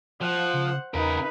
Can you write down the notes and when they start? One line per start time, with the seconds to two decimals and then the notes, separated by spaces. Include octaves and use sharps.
0.21 F3 C5 F#5
0.53 C#3
0.94 E2 C#3 D#4 A#4 B4